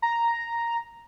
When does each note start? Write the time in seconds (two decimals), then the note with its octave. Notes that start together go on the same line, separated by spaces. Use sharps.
0.02 A#5